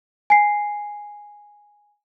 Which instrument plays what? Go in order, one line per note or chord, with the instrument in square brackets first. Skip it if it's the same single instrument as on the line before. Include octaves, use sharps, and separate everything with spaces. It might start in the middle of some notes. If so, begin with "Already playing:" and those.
[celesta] G#5 C7